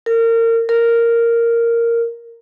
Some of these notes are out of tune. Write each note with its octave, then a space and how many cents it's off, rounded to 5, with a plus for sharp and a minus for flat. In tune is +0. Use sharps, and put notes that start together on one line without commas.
A#4 -30
A#4 -5